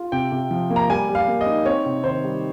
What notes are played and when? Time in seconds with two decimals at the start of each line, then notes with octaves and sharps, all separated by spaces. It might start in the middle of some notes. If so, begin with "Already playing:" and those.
Already playing: F4
0.12 C3 G5
0.32 C3
0.51 F3
0.70 A#3
0.76 A#5
0.89 G3 G#5
1.09 G3
1.15 F5
1.28 A#3
1.41 D#5
1.46 D#4
1.65 C4 C#5
1.86 C3
2.04 D#3 C5
2.24 G3